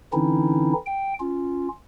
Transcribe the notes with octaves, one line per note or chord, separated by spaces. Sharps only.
D3 E3 C4 C#4 D#4 E4
G5
C#4 F4